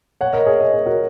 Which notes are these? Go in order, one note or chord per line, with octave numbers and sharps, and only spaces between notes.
C#5 F#5
A#4 D#5
G#4 C#5
A#4 D#5
G#4 C#5
F#4 A#4